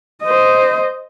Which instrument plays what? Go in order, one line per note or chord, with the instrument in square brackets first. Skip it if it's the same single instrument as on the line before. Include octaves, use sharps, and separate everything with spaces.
[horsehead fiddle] C5 D#5